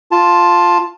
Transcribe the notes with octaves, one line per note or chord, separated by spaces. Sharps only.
F4 A5